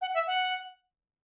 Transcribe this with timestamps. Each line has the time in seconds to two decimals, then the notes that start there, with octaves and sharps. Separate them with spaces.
0.01 F#5
0.13 E5
0.26 F#5